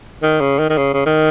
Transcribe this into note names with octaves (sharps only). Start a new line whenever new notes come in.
D#3
C#3
D#3
D#3
C#3
C#3
D#3